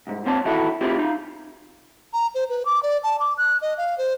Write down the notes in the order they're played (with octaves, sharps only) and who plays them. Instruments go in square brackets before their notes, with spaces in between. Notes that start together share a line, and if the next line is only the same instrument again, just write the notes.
[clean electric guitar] C2 G#2
A#2 C4 C#5 A5
D#3 E3 E4 F#4 A4
C4 E4 F4 G4 G#4
D#4 F4
[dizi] A#5
C5
B4
D6
D5
A5
D6
F#6
D#5
F5
C5